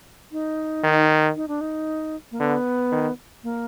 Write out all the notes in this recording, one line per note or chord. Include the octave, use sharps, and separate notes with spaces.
D#4
D#3
D#4
D4
D#4
A#3
D3 B3
D#3
A#3